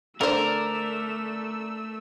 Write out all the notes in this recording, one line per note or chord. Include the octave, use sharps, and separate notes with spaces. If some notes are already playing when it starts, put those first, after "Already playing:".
D3 A3 A#4 C5 D5 E6